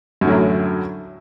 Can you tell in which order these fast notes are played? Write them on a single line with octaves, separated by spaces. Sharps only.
F#2 D3 A2 F#3